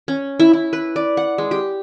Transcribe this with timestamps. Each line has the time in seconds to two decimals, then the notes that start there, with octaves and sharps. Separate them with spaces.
0.08 C#4
0.40 E4
0.53 E4
0.73 B4
0.96 D5
1.17 F#5
1.38 G#3
1.51 G4